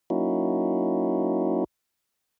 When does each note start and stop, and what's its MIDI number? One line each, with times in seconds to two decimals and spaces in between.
0.10 1.64 54
0.10 1.64 58
0.10 1.64 61
0.10 1.64 63
0.10 1.64 64
0.10 1.64 66